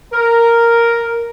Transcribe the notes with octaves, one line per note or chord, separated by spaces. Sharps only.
A#4